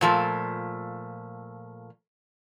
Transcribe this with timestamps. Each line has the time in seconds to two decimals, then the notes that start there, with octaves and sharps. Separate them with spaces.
0.01 A#2 F3 A3